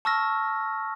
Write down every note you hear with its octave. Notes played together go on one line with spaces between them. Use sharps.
A5 C#6 E6 F6 A#6